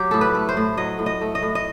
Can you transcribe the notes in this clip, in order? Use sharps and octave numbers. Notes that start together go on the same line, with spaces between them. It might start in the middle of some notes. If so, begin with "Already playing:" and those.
Already playing: F#3 G4
A2 A4
B4
A3
C5
A2
F#3 D#5
A2
D#5
A3
D#5
A2
D#5